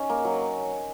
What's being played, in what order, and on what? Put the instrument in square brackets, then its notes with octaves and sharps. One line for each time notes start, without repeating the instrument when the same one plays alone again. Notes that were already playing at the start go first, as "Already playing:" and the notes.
Already playing: [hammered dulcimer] C#4 D#4
A#3
F#3